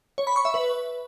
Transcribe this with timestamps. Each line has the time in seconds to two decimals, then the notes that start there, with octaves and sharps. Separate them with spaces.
0.18 C#5
0.27 B5
0.36 C#6
0.45 E5
0.54 B4